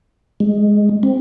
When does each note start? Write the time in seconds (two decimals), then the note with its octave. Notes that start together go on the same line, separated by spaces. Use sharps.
0.40 G#3
1.03 C4